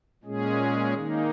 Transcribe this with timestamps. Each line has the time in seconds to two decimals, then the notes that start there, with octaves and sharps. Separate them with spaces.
0.24 A#2 G#3 C#4 G#4
0.95 D#3 A#3 D#4